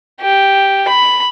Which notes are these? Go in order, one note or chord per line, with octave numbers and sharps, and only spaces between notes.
G4
B5